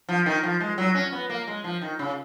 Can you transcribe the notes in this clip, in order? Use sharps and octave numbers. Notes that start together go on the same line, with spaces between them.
F3
D#3
F3
G#3
F#3
C#4
B3
A#3
G#3
F3
D#3
C#3